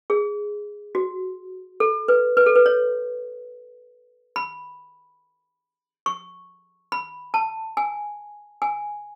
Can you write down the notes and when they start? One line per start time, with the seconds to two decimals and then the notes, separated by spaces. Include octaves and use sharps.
0.10 G#4
0.95 F#4
1.80 A4
2.08 B4
2.37 B4
2.46 A4
2.55 B4
2.66 C#5
4.36 B5
6.06 C#6
6.92 B5
7.34 A5
7.77 G#5
8.62 G#5